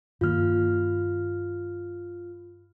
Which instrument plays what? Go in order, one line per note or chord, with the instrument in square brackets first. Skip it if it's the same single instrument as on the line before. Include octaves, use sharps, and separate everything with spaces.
[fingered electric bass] G2 D#3 A#3 [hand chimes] F4 F6